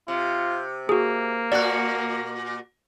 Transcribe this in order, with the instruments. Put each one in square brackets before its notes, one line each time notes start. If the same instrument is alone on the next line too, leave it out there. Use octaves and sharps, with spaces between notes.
[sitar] C3 [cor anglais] F4
[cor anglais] A#3 [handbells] F#4 G#4
[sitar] A#2 F#4 [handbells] D5 F#6